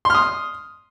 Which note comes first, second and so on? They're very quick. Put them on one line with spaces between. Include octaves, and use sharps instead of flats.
C6 F6 D#6